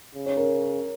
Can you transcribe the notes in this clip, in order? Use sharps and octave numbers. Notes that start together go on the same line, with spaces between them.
C#3
C#5
A#4